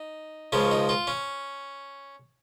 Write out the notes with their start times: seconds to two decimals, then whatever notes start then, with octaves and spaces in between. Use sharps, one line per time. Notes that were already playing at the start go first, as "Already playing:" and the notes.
Already playing: D#4
0.52 C#2 C#3 F3 C#4
0.71 D#4
0.89 F4
1.07 C#4